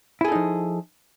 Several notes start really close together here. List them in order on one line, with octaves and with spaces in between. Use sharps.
E4 G#4 A4 D#4 F3